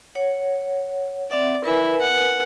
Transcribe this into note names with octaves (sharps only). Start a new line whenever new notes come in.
C#5 F#5
C4 D5 E5 F#5
E4 A#4 B4 G#5
F#5